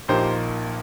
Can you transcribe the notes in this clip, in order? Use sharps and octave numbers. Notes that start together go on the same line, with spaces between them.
A#1 A#2 A#3 D#4 G4 C5